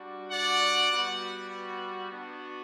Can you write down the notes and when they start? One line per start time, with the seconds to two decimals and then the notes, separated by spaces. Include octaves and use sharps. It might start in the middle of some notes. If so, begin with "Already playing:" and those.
Already playing: G3 D4 F#4
0.31 D5 F#5
0.91 G3 B3 F#4
2.11 B3 D4 F#4